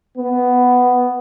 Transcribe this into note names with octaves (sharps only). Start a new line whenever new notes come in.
B3